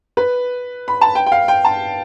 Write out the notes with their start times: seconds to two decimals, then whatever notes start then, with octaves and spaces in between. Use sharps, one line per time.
0.17 B4
0.88 B5
1.01 A5
1.15 G5
1.26 G5
1.32 F5
1.48 G5
1.65 A5